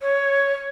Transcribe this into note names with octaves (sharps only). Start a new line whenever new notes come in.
C#5